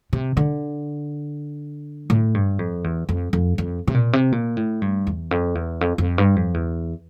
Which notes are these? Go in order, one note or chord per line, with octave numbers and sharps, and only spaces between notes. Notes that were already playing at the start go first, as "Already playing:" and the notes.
C3
D3
A2
G2
F2
E2
F2
F2
F2
C3
A#2
C3
A#2
A2
G2
E2
F2
E2
F2
F2
G2
F2
E2